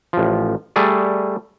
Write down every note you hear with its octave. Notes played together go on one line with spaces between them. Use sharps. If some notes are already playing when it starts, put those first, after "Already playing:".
A1 F3
G3 A3 G#4 D5